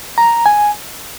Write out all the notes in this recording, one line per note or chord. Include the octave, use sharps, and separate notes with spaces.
A#5
G#5